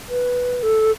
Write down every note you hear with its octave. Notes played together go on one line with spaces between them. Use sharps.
B4
A4